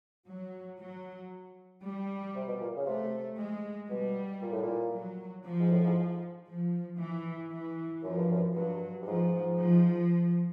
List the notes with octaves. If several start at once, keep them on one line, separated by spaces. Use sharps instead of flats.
F#3
F#3
G3
C3
B2
A#2
C#3
C3 A3
G#3
B2 G3
A#2
A2
A#2
F#3
F3
G#2
A2
G#2
F3
E3
E3
F#2 F3
G2
F#2
G2 F#3
G2
G#2 F3
F3